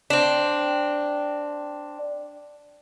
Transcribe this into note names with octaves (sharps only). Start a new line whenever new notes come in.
C4 D4